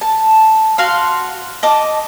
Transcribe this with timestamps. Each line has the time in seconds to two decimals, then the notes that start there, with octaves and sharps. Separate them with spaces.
0.01 A5
0.78 F#4 F5 C6
1.63 D#5 A5 D6